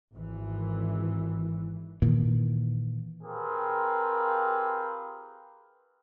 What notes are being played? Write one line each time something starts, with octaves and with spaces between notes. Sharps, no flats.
G#1 E3
A#2 D#3 E3 A#3
C4 F4 G4 G#4 A#4 B4